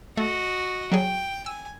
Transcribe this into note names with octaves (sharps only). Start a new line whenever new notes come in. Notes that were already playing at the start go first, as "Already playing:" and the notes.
A3 F#4 D#5
F#3 G3 G#4 G5
G#5 E6